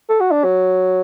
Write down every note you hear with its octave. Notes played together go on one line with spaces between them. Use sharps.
A4
F#4
D4
F#3